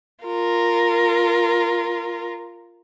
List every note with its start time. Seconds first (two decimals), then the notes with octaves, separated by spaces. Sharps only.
0.24 F4 A#4